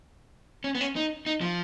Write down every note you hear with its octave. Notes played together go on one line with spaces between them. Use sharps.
C#4
B3
C#4
D#4
D#4
F3